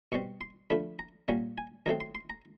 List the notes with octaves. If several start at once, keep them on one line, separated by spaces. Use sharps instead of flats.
B2 G3 C4 C#6
C6
D3 F3 A3 B5
A#5
A#2 G3 A#3 C#4 F#5
G#5
D#3 F#3 A3 C4 A#5
C6
C6
A#5